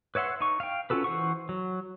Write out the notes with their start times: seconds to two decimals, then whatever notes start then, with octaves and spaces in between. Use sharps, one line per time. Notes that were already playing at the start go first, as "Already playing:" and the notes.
0.15 B4 C#5 E5 F#5 C6
0.41 D#4 C#6
0.60 F5 G5
0.90 C#4 F4 F#4 A4 B4
1.04 E3 C5 F#5 C#6
1.49 F#3